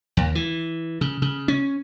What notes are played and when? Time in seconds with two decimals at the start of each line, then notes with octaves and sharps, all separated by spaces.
0.17 D#2
0.35 E3
1.01 C#3
1.22 C#3
1.48 C#4